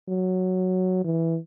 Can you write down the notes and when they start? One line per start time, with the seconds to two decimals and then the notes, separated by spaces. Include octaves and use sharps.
0.08 F#3
1.04 E3